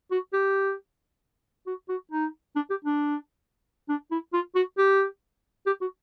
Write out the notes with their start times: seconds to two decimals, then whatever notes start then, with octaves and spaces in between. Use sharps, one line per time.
0.11 F#4
0.33 G4
1.66 F#4
1.89 F#4
2.12 D#4
2.55 D4
2.70 G4
2.85 D4
3.89 D4
4.11 E4
4.33 F4
4.55 F#4
4.78 G4
5.66 G4
5.81 F#4